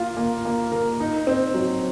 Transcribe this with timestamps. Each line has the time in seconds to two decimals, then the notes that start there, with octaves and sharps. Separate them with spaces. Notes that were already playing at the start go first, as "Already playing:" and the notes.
Already playing: A#3 F4
0.17 A#3
0.45 A#3
0.72 A#4
1.00 D#4
1.27 C4
1.54 F#3